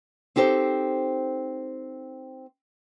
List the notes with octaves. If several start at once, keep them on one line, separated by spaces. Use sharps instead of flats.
C4 D#4 G4 A4 C5